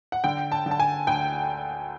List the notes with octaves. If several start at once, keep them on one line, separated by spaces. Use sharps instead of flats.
F#5
D3 G5
A5
D3
A5
G#5
D2 G5